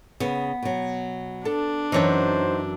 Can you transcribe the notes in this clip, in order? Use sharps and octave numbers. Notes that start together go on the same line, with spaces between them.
C#3 B3
B2 F#3
D4 A4
F#2 E3 D#4 C5 C#5 A5